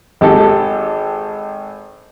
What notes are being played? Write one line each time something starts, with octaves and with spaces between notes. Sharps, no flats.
G#1 G4 A4